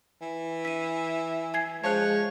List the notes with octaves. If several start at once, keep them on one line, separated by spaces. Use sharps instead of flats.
E3
E5 B6 D#7
G#5 G#6 C7
F3 G#3 C#5 A5 F#6